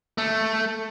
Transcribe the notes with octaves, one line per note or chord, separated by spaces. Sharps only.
A3